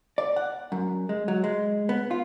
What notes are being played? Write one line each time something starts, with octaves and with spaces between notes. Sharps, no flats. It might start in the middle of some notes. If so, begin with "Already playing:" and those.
D5
F#5
F#2
G#3
F#3
G#3
B3
F4